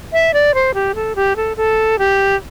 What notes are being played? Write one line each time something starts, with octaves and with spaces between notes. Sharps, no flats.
E5
D5
C5
G4
A4
G4
A4
A4
G4